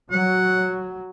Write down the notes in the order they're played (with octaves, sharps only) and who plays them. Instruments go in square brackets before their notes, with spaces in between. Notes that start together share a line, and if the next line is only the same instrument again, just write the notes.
[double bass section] F#3 [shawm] F#5